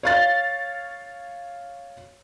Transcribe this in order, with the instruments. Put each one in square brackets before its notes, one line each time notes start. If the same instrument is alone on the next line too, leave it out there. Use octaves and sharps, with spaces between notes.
[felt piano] C#5 F5 A6